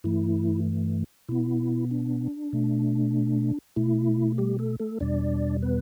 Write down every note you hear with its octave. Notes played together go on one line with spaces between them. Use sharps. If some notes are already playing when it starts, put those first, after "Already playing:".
G2 E3 A3 E4
B2 B3 E4
D4
B2 A3
B2 A3 E4
G3 G4
A3 A4
A3 A4
E2 B2 G3 D4 D5
B3 B4